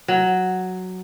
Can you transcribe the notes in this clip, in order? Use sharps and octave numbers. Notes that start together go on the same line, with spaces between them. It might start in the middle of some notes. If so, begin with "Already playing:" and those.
F#3